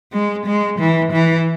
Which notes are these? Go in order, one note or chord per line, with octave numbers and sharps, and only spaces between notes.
G#3
G#3
E3
E3